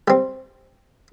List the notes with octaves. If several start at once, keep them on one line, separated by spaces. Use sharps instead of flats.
G3 C4